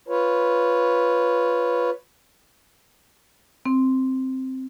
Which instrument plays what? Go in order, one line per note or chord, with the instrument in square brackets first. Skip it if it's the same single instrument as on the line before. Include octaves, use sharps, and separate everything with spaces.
[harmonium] F4 B4 C#5
[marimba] C4